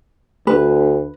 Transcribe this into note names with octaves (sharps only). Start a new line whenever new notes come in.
D2 B4